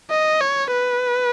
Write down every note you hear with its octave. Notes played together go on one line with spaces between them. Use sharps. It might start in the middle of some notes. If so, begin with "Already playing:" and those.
D#5
C#5
B4